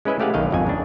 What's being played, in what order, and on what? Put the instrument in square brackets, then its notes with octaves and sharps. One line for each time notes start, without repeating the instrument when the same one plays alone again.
[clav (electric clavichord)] G#3 C#4 E4 B4 D#5 E5
A3 G4 F5 F#5 G#5
B1 D#3 D#5 F5
G#1 F2 G#5
C#3 D4